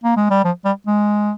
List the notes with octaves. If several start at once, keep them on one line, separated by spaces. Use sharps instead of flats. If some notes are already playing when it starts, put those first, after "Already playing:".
A#3
G#3
G3
F3
G3
G#3